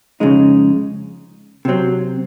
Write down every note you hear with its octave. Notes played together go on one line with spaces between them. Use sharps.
F2 C#3 G#3 D#4
C3 F#3 C4